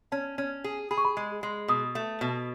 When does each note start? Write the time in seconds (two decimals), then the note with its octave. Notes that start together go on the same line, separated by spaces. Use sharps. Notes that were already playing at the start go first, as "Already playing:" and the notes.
0.12 C#4 A5
0.38 C#4
0.64 G#4
0.91 G#4 B5
0.98 C#6
1.05 B5
1.17 G#3
1.43 G#3
1.68 B2 D#6
1.95 A3
2.21 B2